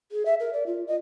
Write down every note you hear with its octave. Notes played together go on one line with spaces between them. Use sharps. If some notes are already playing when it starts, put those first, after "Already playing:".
G#4
E5
A#4
D5
F4
D#5